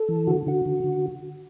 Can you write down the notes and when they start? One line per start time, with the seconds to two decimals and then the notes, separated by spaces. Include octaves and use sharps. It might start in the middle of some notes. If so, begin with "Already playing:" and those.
Already playing: A4
0.09 E3
0.27 D3 F#4
0.46 D3 F#4
0.66 D3
0.84 D3